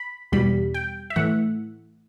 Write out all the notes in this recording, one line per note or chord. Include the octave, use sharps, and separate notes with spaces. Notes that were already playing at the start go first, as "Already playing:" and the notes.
Already playing: B5
E2 B2 G3 B5
G5
E5
A2 E3 A3 F#5